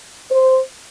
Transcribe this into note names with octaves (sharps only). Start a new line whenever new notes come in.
C5